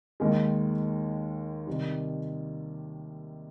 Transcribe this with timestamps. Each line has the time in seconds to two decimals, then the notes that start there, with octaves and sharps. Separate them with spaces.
0.20 D#2 D#3 G#3
1.67 C3 D#3 G3